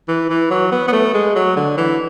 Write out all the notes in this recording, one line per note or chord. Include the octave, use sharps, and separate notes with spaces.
E3
E3
F#3
B3
B3
A3
G#3
F#3
D3
E3